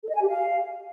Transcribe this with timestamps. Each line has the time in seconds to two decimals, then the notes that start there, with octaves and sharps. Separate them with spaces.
0.02 A4
0.09 D#5
0.15 G#5
0.22 G4
0.28 F5